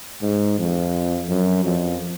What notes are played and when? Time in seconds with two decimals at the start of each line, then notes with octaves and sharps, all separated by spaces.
0.22 G#2
0.58 F2
1.29 F#2
1.65 F2